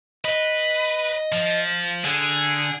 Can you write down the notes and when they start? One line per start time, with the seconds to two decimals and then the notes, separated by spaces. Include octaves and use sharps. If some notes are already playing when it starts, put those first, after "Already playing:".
0.25 B4 D#5
1.32 F3
2.04 D3 G#4